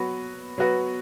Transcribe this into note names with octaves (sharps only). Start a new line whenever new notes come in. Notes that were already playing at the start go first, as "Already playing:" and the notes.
Already playing: F#3 B3 F#4 B4
F#3 B3 F#4 B4